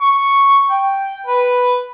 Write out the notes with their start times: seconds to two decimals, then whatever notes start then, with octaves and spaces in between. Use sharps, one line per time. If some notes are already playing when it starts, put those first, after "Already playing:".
0.01 C#6
0.70 G5
1.26 B4